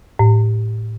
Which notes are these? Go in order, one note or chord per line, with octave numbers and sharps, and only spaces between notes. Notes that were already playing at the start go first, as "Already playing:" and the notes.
A2